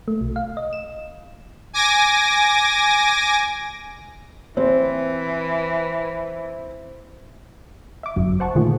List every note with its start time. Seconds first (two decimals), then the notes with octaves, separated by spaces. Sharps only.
0.08 A3
0.21 B1
0.36 F5
0.57 D#5
0.73 E7
1.73 G#5 D6 A#6
4.57 E3 C4
8.03 E5 D6
8.16 G1 F#2 F#3
8.40 C5 F#5 A5 C#6
8.55 A#2 D3 D#3 A3 F4 G#4